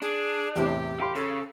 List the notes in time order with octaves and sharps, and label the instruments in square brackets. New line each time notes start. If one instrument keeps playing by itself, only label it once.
[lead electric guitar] D4 [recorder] G#4
[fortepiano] E2 A2 C3 [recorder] G4
[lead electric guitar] G4 [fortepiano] F5 B5 C6
[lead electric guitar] C#3 [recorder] A4